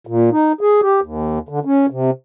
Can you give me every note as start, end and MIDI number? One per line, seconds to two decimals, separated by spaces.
0.07 0.29 46
0.32 0.52 63
0.61 0.81 68
0.82 1.00 67
1.02 1.39 39
1.49 1.59 50
1.65 1.86 61
1.90 2.11 48